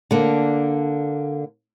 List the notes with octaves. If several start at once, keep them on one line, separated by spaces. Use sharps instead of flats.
D3 A#3 D4